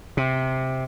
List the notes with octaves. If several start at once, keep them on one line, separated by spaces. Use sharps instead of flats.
C3